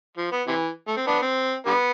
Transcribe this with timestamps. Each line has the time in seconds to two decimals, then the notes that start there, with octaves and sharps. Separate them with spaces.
0.17 F3
0.32 B3
0.48 C3 E3
0.88 A3
0.97 C4
1.07 B3 D4
1.22 C4
1.67 D3 G3 B3